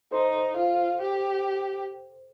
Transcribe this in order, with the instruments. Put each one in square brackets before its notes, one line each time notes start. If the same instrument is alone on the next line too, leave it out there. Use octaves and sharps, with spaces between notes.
[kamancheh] D#4 [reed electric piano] A4 C5
[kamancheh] F4
G4